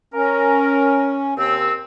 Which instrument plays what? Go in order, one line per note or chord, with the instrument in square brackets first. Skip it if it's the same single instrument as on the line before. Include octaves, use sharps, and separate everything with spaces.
[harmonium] C#4 [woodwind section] A#4
[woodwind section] D#2 C4 E6